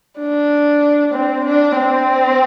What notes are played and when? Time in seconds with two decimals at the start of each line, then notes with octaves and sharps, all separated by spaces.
0.20 D4
1.14 C4
1.45 D4
1.76 C4